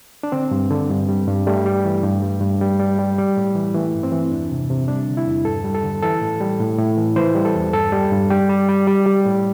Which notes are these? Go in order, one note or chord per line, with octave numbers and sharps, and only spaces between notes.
D4
D3 C4
G2
D3
G2
G3
G2
G3 A3
G3
E3
G2
G3
G2
G3
G3
G3
G3
A2
E3
E3 A3
G2
C4
E3
E2 D4
C3
C3
G3 D4
D3
E4
E2
G2 A4
G3
A4
D3
E3 A4
A2
G3
A2
A2
E3
E3 C5
G3
A4
E2
G2 A4
G3
G2
G3 G4
G3
G3
G3
G3
A2